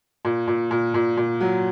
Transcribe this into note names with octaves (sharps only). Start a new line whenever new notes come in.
A#2
A#2
A#2
A#2
A#2
F#3